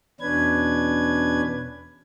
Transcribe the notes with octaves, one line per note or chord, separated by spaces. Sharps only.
E2 B2 C#4 D4 B4 G#6